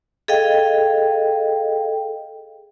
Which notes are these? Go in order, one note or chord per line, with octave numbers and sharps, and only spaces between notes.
G#4 A4 D#5 F5 G5